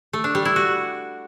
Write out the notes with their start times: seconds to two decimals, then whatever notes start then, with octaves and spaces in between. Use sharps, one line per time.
0.13 A3
0.24 D4
0.35 G3
0.45 E4
0.56 F#4